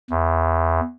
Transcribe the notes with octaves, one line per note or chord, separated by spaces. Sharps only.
E2